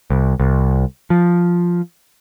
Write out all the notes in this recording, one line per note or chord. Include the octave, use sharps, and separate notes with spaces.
C2
C2
F3